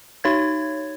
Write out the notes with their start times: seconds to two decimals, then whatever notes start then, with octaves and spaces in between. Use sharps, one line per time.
0.24 D#4 C#5 G#6